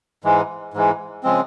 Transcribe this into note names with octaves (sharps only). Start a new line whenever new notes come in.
G#2 E3 G#3
G#2 E3 G#3
C#3 F3 G#3 C4